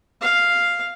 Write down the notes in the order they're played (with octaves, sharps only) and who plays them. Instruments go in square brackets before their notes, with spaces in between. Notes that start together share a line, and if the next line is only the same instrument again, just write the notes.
[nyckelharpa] F5